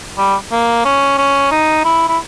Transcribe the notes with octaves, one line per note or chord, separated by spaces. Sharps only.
G3
A#3
C#4
C#4
D#4
E4
E4